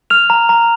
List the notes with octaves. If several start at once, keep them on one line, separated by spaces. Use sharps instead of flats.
F6 F7
A#5
A#5